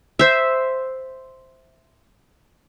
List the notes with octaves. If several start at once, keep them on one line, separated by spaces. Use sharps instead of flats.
C5 E5